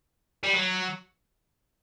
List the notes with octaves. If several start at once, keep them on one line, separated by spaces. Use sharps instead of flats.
G3
F#3